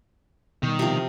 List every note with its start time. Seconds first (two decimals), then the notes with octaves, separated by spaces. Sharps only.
0.63 B2 D#3 G3
0.79 C3 F3